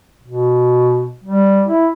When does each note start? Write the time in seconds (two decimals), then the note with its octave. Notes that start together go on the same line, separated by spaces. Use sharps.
0.23 B2
1.24 G3
1.67 E4